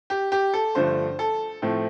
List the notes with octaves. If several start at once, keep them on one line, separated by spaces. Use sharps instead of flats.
G4
G4
A4
G2 D3 F3 A3 C5
A4
A2 F3 A3 C4